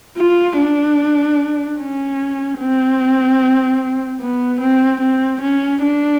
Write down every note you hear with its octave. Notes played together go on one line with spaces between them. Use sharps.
F4
D4
C#4
C4
B3
C4
C4
C#4
D4